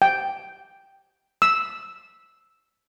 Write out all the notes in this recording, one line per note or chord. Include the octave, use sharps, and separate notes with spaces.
G5
E6